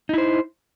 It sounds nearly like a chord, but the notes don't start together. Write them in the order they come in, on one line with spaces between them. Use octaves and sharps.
D#4 E4 C5